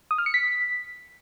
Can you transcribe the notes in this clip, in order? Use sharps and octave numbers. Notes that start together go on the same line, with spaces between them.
D#6
F6
C#7
B6